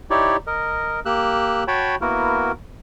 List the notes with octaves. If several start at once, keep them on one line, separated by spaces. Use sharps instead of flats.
D#4 E4 G4 C#5 D5
A#4 D#5
A#3 G4 E6 F#6
F#4 C#5 G5 A5 B5
A#3 B3 E4 F#4 A#4